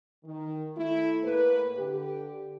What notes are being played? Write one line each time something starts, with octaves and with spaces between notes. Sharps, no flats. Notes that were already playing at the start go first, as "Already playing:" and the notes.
D#3
A3 E4
A2 A#3 B4
D3 G4